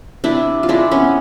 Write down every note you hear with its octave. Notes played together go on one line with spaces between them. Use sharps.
C3 D4 E4
F4
G#3 D4 E4
B3 C#4